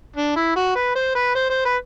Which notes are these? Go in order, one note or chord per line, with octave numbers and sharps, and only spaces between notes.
D4
E4
F#4
B4
C5
B4
C5
C5
B4